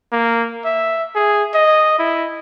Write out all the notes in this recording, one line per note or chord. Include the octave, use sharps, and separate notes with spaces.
A#3
E5
G#4
D#5
E4